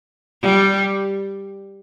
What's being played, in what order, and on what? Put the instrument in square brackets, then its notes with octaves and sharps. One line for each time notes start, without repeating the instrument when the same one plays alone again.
[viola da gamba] G3